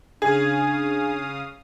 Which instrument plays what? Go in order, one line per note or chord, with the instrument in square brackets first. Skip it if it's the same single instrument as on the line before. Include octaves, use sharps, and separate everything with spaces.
[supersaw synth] C#3 F5 D#6 [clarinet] D4 [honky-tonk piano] G#4